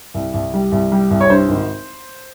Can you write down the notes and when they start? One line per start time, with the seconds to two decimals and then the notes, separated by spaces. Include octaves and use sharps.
0.14 C2
0.34 C2
0.54 G3
0.72 C2
0.92 G3
1.11 C2
1.21 C#5
1.30 G2 C5
1.49 G#1